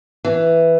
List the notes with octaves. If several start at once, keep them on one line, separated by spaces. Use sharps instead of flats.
E3